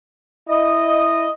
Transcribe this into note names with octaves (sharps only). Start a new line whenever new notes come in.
E4 D#5